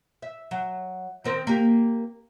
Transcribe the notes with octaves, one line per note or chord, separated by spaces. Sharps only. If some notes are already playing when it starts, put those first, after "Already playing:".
E5
F#3
D#3 C4 A#4
A#3 G4